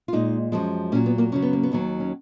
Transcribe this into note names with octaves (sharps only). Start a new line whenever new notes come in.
F4
A#2 G#3 D#4
F#2 F3 G#3
A#2 F#3 C#4
B3
A#3
F#2 C#3 F#3 C#4
B3
A#3
B3
D#2 D#3 F#3
C#4